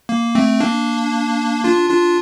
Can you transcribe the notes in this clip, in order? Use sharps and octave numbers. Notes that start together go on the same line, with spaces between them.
A#3
A3 C4
A#3 D4
D4 F4
D4 F4